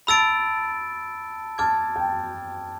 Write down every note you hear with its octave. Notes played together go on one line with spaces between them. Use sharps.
A5 B5 E6 A6 D7
A5 D6 F6 G#6
G5